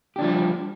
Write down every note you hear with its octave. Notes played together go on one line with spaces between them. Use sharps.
F3 G3 D4 G4